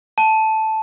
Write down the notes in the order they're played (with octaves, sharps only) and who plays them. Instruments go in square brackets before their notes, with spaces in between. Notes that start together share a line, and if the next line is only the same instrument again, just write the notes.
[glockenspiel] A5